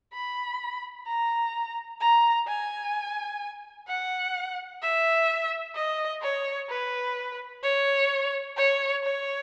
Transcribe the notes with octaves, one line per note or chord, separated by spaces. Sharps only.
B5
A#5
A#5
G#5
F#5
E5
D#5
C#5
B4
C#5
C#5
C#5